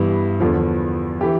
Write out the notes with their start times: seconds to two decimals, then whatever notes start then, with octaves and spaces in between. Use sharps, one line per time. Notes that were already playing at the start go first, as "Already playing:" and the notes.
Already playing: G2 E3 B3
0.40 E2 D3 F3
1.21 E3 G4